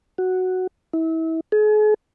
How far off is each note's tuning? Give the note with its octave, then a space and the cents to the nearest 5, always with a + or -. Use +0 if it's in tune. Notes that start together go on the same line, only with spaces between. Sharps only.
F#4 +0
E4 -30
G#4 +40